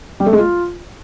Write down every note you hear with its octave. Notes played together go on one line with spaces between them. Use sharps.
G3
A3
G#3
F4